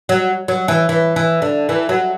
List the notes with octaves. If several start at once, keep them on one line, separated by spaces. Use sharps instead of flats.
F#3
F#3
E3
E3
E3
D3
E3
F#3